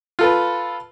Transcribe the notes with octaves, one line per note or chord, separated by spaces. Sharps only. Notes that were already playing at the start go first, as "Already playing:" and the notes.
F4 A4 B4